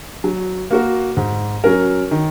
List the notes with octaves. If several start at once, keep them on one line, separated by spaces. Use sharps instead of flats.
F#3
A#3 F#4 A#4
G#2
F#3 C#4 A#4
D#3